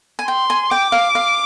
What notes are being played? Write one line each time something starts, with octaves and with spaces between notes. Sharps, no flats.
G#5
G5 C6
G#5
G5 D6
F5
F5